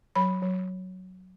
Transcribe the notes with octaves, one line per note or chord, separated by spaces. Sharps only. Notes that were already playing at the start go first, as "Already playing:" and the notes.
F#3 B5
F#3